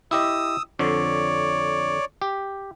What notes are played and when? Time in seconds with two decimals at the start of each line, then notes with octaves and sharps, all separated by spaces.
0.11 E4 G4 D#5 D#6 E6
0.79 F2 D3 C#5 D5
2.22 G4